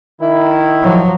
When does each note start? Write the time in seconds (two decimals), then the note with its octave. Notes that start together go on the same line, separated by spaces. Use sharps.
0.21 D#3 E4
0.83 F3 F#3